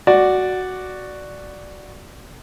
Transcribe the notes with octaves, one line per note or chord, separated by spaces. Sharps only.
F#4 D5